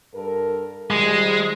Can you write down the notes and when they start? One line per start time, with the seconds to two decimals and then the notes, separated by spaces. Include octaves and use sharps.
0.14 G2 A4 A#4
0.91 D#3 F3 G3 G#3